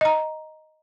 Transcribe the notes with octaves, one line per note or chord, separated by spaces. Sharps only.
D#5 A#5